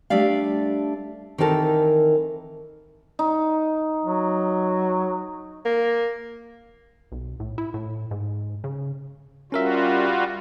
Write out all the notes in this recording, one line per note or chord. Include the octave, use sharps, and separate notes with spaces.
G3 A3 D4 D5 F5
D#3 E3 C4 A4 A#4
D#4
F#3
A#3
B1
A2
E4
A2
G#2
C#3
G3 C#4 F4 F#4 A#4 E5